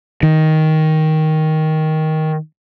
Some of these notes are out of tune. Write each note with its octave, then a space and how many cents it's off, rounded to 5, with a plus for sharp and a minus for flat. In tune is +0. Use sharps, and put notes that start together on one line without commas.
D#3 +10